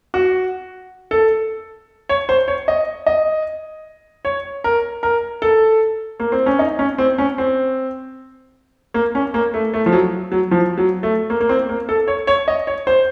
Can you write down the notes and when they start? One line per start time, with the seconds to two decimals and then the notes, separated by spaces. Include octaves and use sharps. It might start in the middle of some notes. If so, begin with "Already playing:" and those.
0.14 F#4
1.11 A4
2.09 C#5
2.29 C5
2.48 C#5
2.68 D#5
3.06 D#5
4.25 C#5
4.64 A#4
5.03 A#4
5.42 A4
6.20 A#3
6.32 C4
6.46 C#4
6.59 D#4
6.79 C#4
6.98 C4
7.18 C#4
7.38 C4
8.94 A#3
9.15 C#4
9.34 A#3
9.54 A3
9.74 A3
9.86 F3
9.92 F#3
10.32 F#3
10.51 F3
10.78 F#3
11.03 A3
11.30 A#3
11.41 A#3
11.49 C4
11.69 A#3
11.89 A4
12.08 C#5
12.27 C#5
12.48 D#5
12.67 C#5
12.87 C5